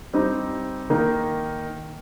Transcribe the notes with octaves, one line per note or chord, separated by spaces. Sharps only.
G3 C4 D#4
D#3 A#3 D#4